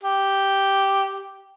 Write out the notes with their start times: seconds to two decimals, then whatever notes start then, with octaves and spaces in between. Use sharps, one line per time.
0.03 G4